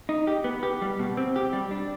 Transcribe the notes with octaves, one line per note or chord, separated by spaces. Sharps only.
D#4
G4
B3
G4
G3
B2
C4
G4
G3
D4